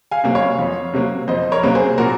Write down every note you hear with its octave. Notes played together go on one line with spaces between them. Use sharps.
F5 G#5
C3 F#3 A#3
C#5 F5
F2
C3 F#3 A#3
F2 C5 D#5
A#4 C#5
C3 F#3 A#3
G#4 C5
A#2 F#4 A#4